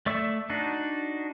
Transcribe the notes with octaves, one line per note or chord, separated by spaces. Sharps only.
A3 D5 E5 C#6 E6
D4 D#4 F#4